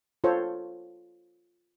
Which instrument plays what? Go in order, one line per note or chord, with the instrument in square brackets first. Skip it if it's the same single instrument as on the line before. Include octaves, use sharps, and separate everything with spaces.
[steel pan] F4 A4 C5 C#5